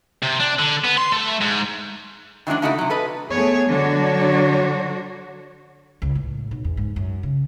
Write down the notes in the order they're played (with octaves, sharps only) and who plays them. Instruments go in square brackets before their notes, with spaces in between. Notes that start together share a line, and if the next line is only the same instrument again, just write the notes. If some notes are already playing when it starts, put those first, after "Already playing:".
[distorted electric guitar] C3
D4
D3
B3
C6
A3
G#2
[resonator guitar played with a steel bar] D#3 E3 F#3 G#3 D4
C#3 A3 D#4 E4 F#4 A4
C3 F#3
A4 B4 D#5
[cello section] A3 B3 G#4 C#5
D3 F#3 D4 F#4 C#5
[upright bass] C#2
A2
B1
E2
G#2
F#2
C#3